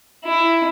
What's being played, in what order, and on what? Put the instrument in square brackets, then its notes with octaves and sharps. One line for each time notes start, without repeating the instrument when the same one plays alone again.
[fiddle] E4